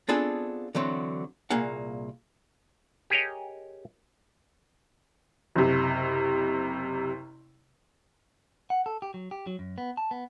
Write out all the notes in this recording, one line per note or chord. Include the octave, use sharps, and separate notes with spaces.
B3 C4 D4 F4 G#4 A4
D3 E3 F#3 C4
C2 A#2 A#3 G#4 F5 F#5
G4 G#4 A#4 C#5 D#5
F#1 C3
F#5
A4
G4
F#3
G4
F#3
F#2
B3
A5
B3